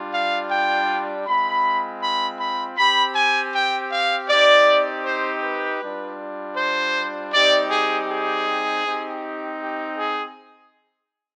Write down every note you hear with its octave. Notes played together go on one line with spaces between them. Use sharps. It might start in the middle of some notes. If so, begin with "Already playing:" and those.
Already playing: G3 D4 F4
F5
G5
G#3 C4 F4 B5
B5
B5
C4 G4 B5
G#5
G5
F5
C4 D#4 G4 D5
C5
B4
G3 D4 F4
C5
G3 C4 D#4 G4 D5
G#4
G#4
C4 D#4 G4
G4
G#4